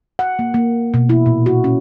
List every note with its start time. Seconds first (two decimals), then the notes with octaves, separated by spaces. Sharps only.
0.19 F#5
0.39 A#3
0.54 A#3
0.94 B2
1.09 E4
1.26 A#2
1.46 F#4
1.64 C#4